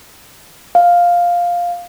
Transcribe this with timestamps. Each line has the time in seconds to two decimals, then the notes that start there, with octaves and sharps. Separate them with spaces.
0.75 F5